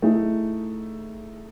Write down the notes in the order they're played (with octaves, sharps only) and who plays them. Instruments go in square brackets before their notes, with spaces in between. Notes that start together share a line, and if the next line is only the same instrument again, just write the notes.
[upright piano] A3 D#4 E4 G#4